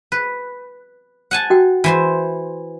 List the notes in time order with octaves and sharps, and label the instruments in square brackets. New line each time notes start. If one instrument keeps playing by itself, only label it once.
[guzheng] B4
F#5 G#5 A5
[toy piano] F#4 G5
[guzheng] E3 C5 C6